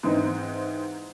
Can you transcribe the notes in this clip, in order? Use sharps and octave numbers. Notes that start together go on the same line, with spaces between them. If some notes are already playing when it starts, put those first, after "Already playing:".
G#2 E3 C4 D#4